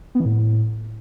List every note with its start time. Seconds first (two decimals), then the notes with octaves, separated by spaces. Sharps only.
0.15 B3
0.20 E3
0.25 A2